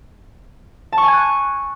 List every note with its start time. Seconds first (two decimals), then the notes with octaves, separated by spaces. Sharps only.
0.92 A5
0.98 C#6
1.03 G#5
1.08 G#6
1.13 F#6